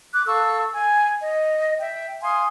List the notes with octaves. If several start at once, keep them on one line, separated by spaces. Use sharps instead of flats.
D6 F#6
A4 F5 C#6 E6
G#5
D#5
E5 G5
F5 G#5 C6 D#6